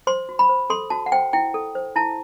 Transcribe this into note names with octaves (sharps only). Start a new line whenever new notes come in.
C5 C6
F#4
B5
C5
A4 C6
F#4 A5
F#5
C5 G5
E4 G5
A4
C5
E4 A5